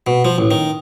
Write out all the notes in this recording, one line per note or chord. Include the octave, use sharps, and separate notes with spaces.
B2
F3
A1
D#3